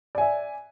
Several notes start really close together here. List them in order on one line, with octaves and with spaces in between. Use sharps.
D5 G#5 E5